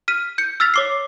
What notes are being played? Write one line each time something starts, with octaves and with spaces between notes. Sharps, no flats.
F6 B6 D#7
G6 C#7
E6 F6 A6 B6 F7
C#5 D6 C7